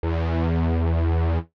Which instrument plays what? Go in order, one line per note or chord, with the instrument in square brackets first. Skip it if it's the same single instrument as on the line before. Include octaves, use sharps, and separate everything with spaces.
[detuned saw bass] E2